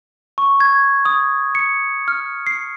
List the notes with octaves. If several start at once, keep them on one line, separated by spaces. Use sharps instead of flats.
C#6
G#6
D#6
C#7
F6
C7